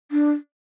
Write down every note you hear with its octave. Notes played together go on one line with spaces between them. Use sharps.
D4